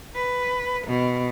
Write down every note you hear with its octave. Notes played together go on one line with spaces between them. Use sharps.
B4
B2